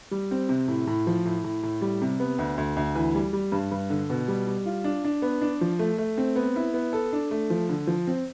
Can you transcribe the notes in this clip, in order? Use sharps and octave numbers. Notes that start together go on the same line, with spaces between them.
G3
C4
C3
A2
A2
F3
A2
A2
A2
G3
C3
B3
D2
D2
D2
E3
G3
G3
G2
G2
D3
B2
G3
G3
F4
D4
D4
B3
D4
F3
A3
A3
C4
B3
E4
B3
A4
D4
A3
F3
D3
F3
C4